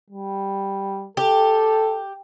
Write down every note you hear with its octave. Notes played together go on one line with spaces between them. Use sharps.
G3
G4 A4